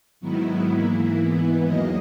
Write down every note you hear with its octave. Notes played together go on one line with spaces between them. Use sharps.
G#2 D#3 F#3 B3 E4
G#2 E3 A#3 E4
G#2 E3 B3 E4
E2 D#3 F#3 A#3 D#5